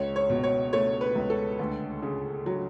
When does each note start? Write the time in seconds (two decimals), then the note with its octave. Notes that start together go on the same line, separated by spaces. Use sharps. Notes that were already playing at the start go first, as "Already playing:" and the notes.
Already playing: C#2 C#5
0.16 C#5
0.30 B2
0.43 C#5
0.73 A3 C#5
1.01 B4
1.15 C#2
1.30 A4
1.59 D2
2.03 C#3
2.46 F#3